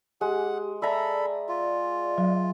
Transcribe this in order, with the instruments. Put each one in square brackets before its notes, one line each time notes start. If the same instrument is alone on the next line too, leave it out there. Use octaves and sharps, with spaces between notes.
[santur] G#3 [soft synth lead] G4 [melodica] F#5
[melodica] A4 B5 [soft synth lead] D5 [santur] E5 A#5
[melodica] F4
[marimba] F#3